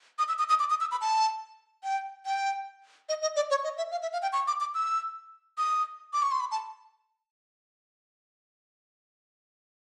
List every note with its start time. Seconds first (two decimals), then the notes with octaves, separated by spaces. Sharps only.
0.19 D#6
0.28 E6
0.39 D#6
0.49 D#6
0.59 D6
0.70 D#6
0.80 E6
0.91 B5
1.01 A5
1.84 G5
2.25 G5
3.09 D#5
3.22 D#5
3.36 D5
3.50 C#5
3.64 D#5
3.78 E5
3.92 F5
4.02 E5
4.13 F5
4.22 G5
4.33 C#6
4.48 D6
4.61 D6
4.75 E6
5.58 D#6
6.13 D6
6.22 C#6
6.32 C6
6.40 B5
6.51 A5